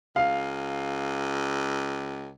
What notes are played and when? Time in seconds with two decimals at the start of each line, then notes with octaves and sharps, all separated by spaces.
0.16 C#2 F5